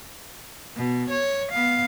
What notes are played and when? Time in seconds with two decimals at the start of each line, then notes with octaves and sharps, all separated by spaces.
0.76 B2
1.10 C#5
1.52 B3 F5